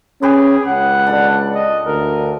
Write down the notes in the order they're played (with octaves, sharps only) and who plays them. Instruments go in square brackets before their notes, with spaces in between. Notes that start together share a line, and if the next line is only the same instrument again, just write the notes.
[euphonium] C#4 [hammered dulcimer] G4 B4 D6 [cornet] G#4
[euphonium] C#2 [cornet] F#5
[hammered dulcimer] D4 A4
[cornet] D#5
[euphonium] D2 [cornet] A#4